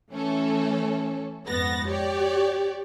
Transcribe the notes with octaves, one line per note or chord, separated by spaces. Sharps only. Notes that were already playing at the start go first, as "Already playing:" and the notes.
E3 A3 C#4 A4
F2 G#2 B3 A6 A#6
G4 C#5 D5